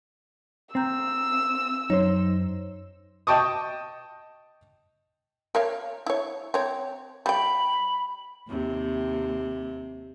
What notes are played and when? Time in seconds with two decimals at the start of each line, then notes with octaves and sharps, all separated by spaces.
0.75 C4 G5 A#5 E6 G6
1.90 F#2 D#4 C5 C#5
3.27 D#5 G5 A5 C#6 D#6
5.55 A#4 C#5 F5
6.06 E4 C#5
6.54 C4 C#5
7.26 G3 G5 B5
8.48 D#2 C3